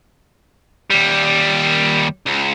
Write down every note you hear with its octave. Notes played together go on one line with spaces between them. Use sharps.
D#2 G3
C#2